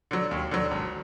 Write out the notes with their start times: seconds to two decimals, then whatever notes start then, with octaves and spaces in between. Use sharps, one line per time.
0.11 D3 F#3
0.31 D#2
0.51 D3 F#3
0.71 G#1